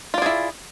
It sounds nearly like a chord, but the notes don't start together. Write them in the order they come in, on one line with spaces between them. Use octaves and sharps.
F4 D5 G#4 E4